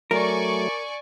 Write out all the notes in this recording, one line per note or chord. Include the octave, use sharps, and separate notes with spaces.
F#3 A3 A#4 D5 G#5 C#6